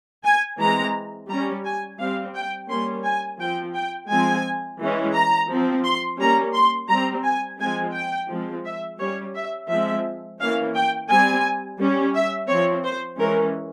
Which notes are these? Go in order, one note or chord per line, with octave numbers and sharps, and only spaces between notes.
G#5
E3 G#3 C4 A#5
G3 C#4 A#5
G#5
G3 C4 F5
G5
G3 A#3 C#4 C6
G#5
F3 C4 G5
G5
F3 G#3 C4 G#5
E3 G#3 C#4
A#5
F3 C4
C6
G3 A#3 C#4 A#5
C6
G3 C4 A#5
G#5
F3 G#3 C4 G#5
G5
F3 G#3 C4
E5
G3 C#4 C#5
E5
F3 G#3 C4 E5
E3 A#3 C#4 F5
G5
G3 C4 G#5
G3 C#4
E5
F3 C4 C#5
C5
E3 G#3 C#4 A#4